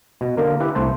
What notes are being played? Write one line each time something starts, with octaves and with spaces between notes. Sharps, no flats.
B2
D3 A#3 A#4
E4 G4 B4
C2 A3 C5 A5